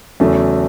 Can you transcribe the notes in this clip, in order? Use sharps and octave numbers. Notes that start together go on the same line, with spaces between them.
E2 C#3 F#3 A3